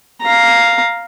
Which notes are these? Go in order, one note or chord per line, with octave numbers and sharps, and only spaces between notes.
F5 A#5